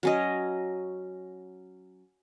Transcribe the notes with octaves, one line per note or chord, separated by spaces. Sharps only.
F#3 C#4 D#5